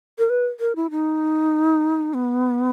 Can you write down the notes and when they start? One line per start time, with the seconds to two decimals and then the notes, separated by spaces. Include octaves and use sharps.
0.19 A#4
0.30 B4
0.60 A#4
0.76 E4
0.91 D#4
2.14 B3